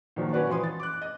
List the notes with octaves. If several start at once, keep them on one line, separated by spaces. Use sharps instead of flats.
A#2 D#3 F3 F#3
C#4 F#4 B4 D5 F#5
E3 F3 C6 D#6
A6
D6 F#6
D#5